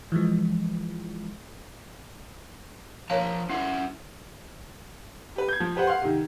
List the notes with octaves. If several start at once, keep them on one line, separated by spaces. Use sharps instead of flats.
E3 F3 G#3
F3 A#4 C#5 F5 A5 A#5
C#4 E4 E5 F#5
G4 B4
G6 G#6
F3
G4 B4 C5 F#5
F5 F#5 C6
C3 D#3